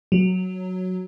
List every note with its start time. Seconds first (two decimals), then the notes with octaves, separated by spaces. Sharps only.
0.12 F#3